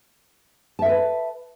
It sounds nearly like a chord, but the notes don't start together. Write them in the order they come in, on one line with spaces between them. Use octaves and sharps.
A5 E5 A#4 B4